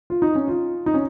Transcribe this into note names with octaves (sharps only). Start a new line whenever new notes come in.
F4
D#4
C#4
F4
D#4
C#4